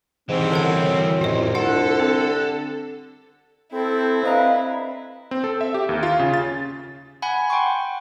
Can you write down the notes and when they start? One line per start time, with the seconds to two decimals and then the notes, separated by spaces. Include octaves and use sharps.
0.29 G#2 E3 G3 C4
0.52 F#2 D3 C#5 F#5
1.21 C2 F2 A2 F4 D#5
1.55 D3 F4 A4 F#5
2.00 C4
3.72 C4 E4 A4
4.23 C4 D4 A4 B4 D#5 F5 A#5
5.31 C4
5.44 A4
5.61 E5
5.74 G4
5.89 D#2
6.03 F4
6.19 C#3
6.34 A6
7.22 F#5 G#5 B5
7.50 F#5 G5 C6 C#6